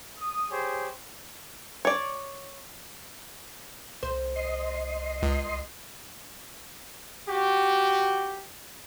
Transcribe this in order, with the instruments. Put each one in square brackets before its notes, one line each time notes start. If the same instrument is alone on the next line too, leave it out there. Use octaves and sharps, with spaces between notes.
[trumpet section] D#6
G4 G#4 C5 C#5
[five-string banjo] C#5 D5
[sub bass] C2 [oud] C5
[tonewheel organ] D#5 C6
[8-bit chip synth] C#2
[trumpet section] F#4 G4